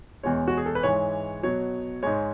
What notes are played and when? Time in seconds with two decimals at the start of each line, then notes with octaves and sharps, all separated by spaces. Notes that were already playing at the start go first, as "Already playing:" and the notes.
0.23 E2 B2 G#3 C#5
0.48 F#4
0.57 G#4
0.66 A4
0.75 B4
0.83 G#2 E3 G#3 C#5
1.43 B2 F#3 C#5
2.03 G#2 G#3 C#5